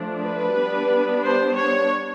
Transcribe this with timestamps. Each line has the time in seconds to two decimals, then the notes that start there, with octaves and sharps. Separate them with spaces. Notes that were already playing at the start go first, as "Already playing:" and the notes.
Already playing: F3 A3 D4
0.21 B4
0.54 G3 B3 D4
1.21 C5
1.55 C#5